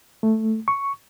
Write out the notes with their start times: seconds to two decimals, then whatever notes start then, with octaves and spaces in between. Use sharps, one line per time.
0.23 A3
0.68 C#6